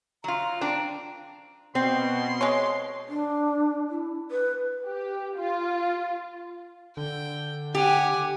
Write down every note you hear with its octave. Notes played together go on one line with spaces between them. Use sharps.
F#3 F4 A#5
C4 D4
B2 C4 C6
G#3 C#5
D4
E4
B4
G4
F4
D3 G5
G4 F#5 G#5